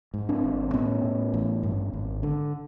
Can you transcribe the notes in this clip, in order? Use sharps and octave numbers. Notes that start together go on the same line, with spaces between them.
G#2
C4 D4
G#1
A2 B3 C#4
A2
A1
G2
G#1
D3